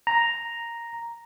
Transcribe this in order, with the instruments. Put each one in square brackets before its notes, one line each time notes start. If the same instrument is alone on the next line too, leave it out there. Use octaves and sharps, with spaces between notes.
[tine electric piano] A#5